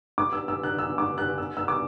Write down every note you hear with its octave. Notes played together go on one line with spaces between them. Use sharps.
D6
E6
E6
F#6
E6
D6
F#6
E6
E6
D6